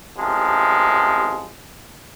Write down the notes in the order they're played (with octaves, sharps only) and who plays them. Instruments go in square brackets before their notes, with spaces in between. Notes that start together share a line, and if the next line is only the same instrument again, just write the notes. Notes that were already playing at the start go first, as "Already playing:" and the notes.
[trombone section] A1 C3 F3 G#3